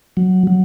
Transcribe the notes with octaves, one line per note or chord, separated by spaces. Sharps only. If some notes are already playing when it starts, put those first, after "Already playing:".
F#3
F#3